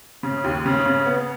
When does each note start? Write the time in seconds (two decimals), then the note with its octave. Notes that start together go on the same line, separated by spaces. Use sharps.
0.23 C#3
0.44 D#2
0.66 C#3
0.86 C#3
1.06 B3